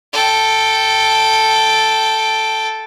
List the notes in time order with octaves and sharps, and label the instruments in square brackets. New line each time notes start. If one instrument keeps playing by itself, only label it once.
[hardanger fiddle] A4 G5